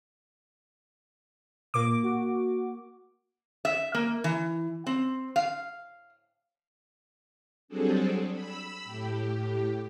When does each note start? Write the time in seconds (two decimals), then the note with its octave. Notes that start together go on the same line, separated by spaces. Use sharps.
1.74 A#2 A#3 D6
2.03 F#4
3.65 E5
3.94 A#3
4.24 E3
4.87 C4
5.36 F5
7.68 F#3 G3 C4 D4 G#4 A4
8.31 B5 E6
8.84 A2 G4